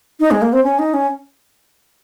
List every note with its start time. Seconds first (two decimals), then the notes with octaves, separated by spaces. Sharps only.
0.20 D#4
0.31 G#3
0.42 A#3
0.53 C4
0.64 C#4
0.79 D#4
0.94 C#4